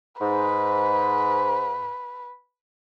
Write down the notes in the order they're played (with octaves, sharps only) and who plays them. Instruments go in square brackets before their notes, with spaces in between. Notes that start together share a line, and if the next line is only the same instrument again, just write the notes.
[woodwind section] G#2 [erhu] B4